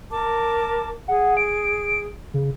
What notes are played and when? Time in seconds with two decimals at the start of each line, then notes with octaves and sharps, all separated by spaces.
0.10 A#4 A5 D6
1.08 G#4 F#5
1.37 D7
2.34 C#3